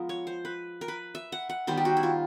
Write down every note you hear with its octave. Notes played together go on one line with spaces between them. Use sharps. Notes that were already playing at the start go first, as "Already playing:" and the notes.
Already playing: F3 G#3 B3 A#4
C#5
C5
B4
A#4
B4
E5
F#5
F#5
D#3 G3 B3 C5
G4
F#4
E4
F4